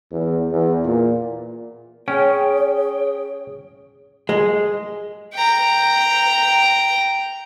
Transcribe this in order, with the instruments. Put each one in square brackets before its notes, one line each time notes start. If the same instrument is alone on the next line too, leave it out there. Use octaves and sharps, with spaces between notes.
[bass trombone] E2
E2
A#2
[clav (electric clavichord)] C#4 [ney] G#4 [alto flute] C#5 [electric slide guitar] G5
[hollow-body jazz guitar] G#3
[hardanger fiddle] G5 A#5